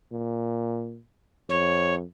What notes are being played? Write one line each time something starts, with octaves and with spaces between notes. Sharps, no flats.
A#2
F2 C#5